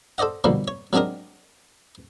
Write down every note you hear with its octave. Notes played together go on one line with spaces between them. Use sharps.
A4 C5 D5 D#5 F#5
B2 D3 F3 G3 A#3
C#5
F#3 G#3 C4 D4 G#4 A#4